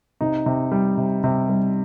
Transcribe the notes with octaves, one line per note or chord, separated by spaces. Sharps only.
C3 D#4
C3
G3
C3
C3
G3